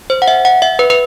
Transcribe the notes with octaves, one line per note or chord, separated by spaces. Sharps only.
C5
F#5
E5
F#5
E5
B4
B4